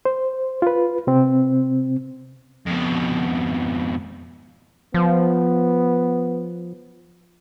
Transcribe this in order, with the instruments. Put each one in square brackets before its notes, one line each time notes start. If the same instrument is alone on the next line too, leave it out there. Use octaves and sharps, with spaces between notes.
[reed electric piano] C5
F4 B4
C3 C4
[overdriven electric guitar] F2 B2
[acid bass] F3 [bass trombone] B3